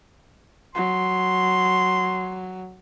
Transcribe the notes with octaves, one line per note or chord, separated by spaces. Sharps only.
F#3 C6